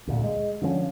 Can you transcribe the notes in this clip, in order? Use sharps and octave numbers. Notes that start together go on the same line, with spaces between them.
D2 A#2
G#3
D3 F3 A3 C#4